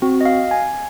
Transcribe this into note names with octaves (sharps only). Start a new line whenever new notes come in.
C4 F#4
D#5
F5
G#5